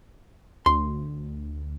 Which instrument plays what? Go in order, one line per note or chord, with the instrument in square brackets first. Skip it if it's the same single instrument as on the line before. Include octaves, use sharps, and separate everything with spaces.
[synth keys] D2 [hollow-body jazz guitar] C6